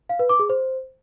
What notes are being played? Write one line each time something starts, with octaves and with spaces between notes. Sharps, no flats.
F5
B4
D6
G#4
C5